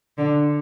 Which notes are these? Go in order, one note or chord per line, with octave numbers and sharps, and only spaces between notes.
D3